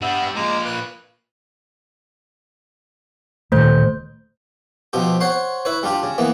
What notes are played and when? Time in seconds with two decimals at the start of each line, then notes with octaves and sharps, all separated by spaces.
0.02 G3 B3 D4 E5
0.36 F3 G#3 A#3 A#5 D6
0.66 B4 F#6
3.52 D1 A#2 D#3 A3 C5 G6
4.93 B2 F3 C4 G4
5.20 C5 C#5 F#5 C6
5.65 E4 B4 C#5
5.83 G3 D4 F4 G4
6.03 C#3
6.18 E3 A#3 B3